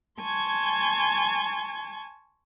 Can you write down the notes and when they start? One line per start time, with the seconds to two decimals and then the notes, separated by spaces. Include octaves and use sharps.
0.19 G#5 A5 C6 C#6 G#6